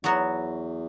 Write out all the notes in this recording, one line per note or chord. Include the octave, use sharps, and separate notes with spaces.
E2 F#3 B3 F#4 C#5